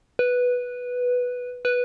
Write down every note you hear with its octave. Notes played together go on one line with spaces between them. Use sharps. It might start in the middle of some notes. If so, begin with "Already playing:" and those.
B4
B4